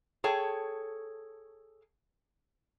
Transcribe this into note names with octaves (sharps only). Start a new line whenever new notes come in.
G#4 A4 C#5 G5 A5